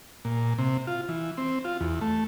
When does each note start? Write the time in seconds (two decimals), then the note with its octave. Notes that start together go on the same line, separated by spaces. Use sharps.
0.25 A#2
0.59 C3
0.87 F4
1.09 E3
1.38 C4
1.64 F4
1.81 E2
2.01 A3